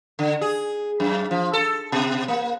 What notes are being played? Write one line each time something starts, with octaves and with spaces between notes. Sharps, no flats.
D3
G#4
F#2
F3
A4
B2
A#3